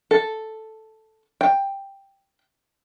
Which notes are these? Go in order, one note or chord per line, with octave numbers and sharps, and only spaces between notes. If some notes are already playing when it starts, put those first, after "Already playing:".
A4
G5